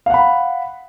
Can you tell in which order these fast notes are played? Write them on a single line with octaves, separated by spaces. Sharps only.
F5 F#5 B5